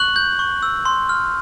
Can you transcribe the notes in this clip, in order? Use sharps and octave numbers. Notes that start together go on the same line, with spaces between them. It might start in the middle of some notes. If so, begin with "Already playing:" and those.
Already playing: C#6 F#6 F#7
G6
C#6
E6
C6
F6